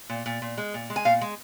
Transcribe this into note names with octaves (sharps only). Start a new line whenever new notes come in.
A#2
A#2
A#2
G#3
A#2
G#3
G#5
A#2 F5
G#3